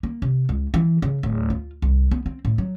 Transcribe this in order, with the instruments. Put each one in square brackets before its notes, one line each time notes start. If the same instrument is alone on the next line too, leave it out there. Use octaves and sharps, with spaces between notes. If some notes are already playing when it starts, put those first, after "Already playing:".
[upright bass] A#3
C3
C#2
E3
C#3
D1
F4
C2
B3
C4
A2
F#3